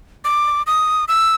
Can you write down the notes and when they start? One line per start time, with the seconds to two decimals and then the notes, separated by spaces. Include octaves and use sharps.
0.25 D6
0.67 D#6
1.08 E6